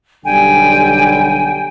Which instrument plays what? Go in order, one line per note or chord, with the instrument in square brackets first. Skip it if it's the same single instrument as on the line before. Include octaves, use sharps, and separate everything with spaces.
[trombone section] B1 D3 G3 [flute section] G5 G#5